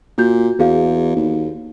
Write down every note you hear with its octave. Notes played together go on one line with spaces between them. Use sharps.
A#2 F#4 G6
E2 F#4 G#4 F5
D#2